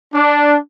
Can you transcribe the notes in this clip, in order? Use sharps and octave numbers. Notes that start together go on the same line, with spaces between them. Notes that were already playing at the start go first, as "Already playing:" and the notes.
D4